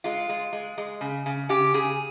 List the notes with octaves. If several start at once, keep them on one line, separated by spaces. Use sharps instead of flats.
G#3 F4
G#3
G#3
G#3
C#3
C#3
C#3 G4
C#3 G#4